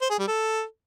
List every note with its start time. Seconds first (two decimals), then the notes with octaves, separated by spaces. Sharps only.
0.01 C5
0.10 G#4
0.19 G3
0.28 A4